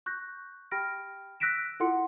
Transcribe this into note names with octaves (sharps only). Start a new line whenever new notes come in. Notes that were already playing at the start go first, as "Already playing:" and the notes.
C#6 F#6 G6 A#6
G4 G5 B5 F6 A#6 D7
E6 F#6 A#6 B6 D7 E7
E4 F4 A4 F#5 C6 C#7